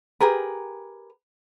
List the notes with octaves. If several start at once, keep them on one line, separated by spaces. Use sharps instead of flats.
G4 G#4 A#4 B4